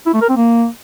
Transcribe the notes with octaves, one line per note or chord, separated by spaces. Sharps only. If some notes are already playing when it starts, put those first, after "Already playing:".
E4
A3
A#4
C4
A#3